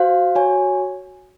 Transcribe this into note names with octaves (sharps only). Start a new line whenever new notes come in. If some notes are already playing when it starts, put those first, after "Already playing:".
Already playing: F#4 C5 F5
F#4 C#5 G#5